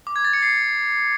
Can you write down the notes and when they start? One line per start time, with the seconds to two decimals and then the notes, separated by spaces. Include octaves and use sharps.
0.07 D6
0.16 G#6
0.25 A6
0.33 C#7
0.42 C7